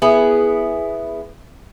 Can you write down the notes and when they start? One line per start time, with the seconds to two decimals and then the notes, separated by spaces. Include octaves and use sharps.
0.02 B3 E4 G#4